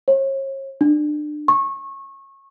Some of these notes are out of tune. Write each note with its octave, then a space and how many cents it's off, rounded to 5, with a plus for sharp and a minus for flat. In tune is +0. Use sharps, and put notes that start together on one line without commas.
C#5 -40
D4 +30
C#6 -25